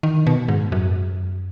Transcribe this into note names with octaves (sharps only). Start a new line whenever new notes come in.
D#3
B2
G#2
F#2